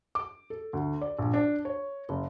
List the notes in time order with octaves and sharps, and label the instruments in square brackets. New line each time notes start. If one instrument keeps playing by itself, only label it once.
[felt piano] D6
A4
D2
D5
A#1
D4
C#5
F#1